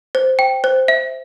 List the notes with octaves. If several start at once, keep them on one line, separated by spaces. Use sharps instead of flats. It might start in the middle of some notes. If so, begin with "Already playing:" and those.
C5
G5
C5
E5